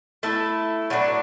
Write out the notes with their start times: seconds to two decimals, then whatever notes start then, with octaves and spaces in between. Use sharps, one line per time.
0.23 A3 E4 A4
0.90 A2 F#3 D4 B4